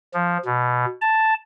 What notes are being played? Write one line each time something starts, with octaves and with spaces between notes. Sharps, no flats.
F3
B2
A5